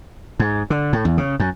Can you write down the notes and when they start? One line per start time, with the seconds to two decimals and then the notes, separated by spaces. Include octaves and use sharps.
0.39 G#2
0.70 D3
0.93 A2
1.05 E2
1.18 C#3
1.40 F#2